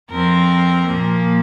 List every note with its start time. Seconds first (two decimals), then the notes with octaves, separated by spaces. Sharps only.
0.11 F2 F3 C4 A#4
0.87 A#2 F3 A#3